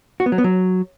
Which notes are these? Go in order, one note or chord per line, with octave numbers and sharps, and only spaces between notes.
F#4
B3
F#3
B3
F#3